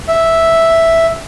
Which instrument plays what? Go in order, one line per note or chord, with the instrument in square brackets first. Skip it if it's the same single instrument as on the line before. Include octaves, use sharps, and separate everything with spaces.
[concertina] E5